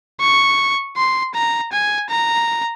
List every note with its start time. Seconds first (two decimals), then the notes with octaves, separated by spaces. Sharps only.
0.20 C#6
0.96 C6
1.34 A#5
1.72 G#5
2.10 A#5